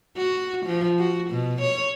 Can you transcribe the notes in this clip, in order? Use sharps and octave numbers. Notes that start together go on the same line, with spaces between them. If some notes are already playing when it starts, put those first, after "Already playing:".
F#4
F3
F#4
B2
C#5